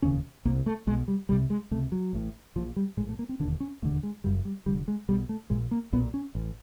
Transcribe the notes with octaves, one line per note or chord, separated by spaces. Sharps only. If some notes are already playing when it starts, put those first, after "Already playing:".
E1 D#2 C#3 C#4
C2 C3 A#3
A3
B1 B2 G#3
G3
C2 C3 G3
G#3
C#2 C3 A3
F#3
A1 A2
A#1 A#2 F3
G3
A#1 A2 G#3
A3
A#3
C4
E1 D#2 D3 D4
C#4
E1 D#2 D3 A3
G#3
F#1 F#2 C#3 G3
G3
F1 F2 D3 G3
G#3
B1 B2 G3
A3
A#1 A#2 G#3
A#3
B1 A#2 B3
C#4
A1